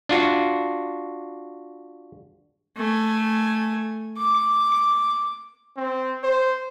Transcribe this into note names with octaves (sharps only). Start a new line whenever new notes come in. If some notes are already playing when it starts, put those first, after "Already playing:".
D4 F4 F#4
A3 G#5
D6
C4
C5